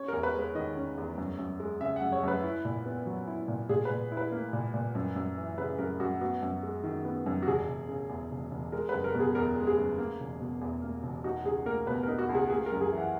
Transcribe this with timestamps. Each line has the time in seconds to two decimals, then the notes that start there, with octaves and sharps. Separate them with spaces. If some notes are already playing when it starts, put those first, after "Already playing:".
Already playing: C#4 C#5
0.08 E2 A#4
0.23 B4
0.34 G#3
0.39 B4
0.55 D#3 D#5
0.76 C#4
0.97 E2
1.17 F#2
1.39 F#2
1.60 G#3
1.80 C#3 E5
1.96 F#2 F#5
2.12 C#5
2.23 F#2 B4
2.43 E4
2.65 A#2
2.86 B3
3.06 F#3
3.28 E4
3.48 A#2
3.69 A#2 G#4
3.85 A#2 B4
4.12 E4
4.17 B4
4.32 A#3
4.53 A#2
4.74 A#2
4.95 F#2
5.16 F#2
5.37 E3
5.58 C#3 B4
5.79 F#2 A#4
6.00 F#2 F#4
6.21 B3 F#4
6.42 F#2
6.63 G#3
6.84 D#3
7.05 B3
7.26 F#2
7.42 F#4
7.47 E1 G#4
7.68 E1
7.89 C#3
8.09 E2
8.31 E1
8.51 E1
8.72 G#3 A#4
8.89 F#1 B4
9.04 A#4
9.15 B2
9.20 G#4
9.35 E2 A#4
9.56 G#3
9.67 G#4
9.77 F#1
9.98 A#3
10.20 E1
10.41 B2
10.61 E2
10.82 A#3
11.03 E1
11.24 D#4 F#4
11.45 C#2 G#4
11.66 A#3 A#4
11.87 B2 B4
12.03 D#4 A#4
12.19 F#4
12.29 C#2
12.35 G#4
12.50 A#3 G#4
12.66 A#4
12.72 F#2
12.81 G#4
12.92 E3
12.98 F#5